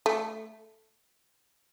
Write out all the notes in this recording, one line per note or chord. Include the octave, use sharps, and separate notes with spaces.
A3